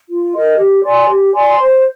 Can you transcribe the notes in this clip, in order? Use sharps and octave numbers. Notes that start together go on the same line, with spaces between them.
F4
A#4 D#5
G4
D5 G#5 C6
G4
D5 G#5 C6
C5